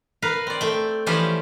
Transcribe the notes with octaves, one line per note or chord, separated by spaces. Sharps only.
A#4 B4 F5
C4 D5
A3 G5
E3 F3 C#4 G4 D5